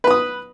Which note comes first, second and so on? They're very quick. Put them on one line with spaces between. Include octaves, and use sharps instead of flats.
B4 B5 D#6